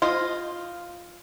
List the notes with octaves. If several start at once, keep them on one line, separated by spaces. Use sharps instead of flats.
F4 C5 D#5